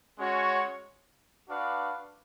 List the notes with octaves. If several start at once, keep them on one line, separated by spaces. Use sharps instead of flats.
G#3 C#4 F#4 C#5
D4 F#4 B4 D5 F5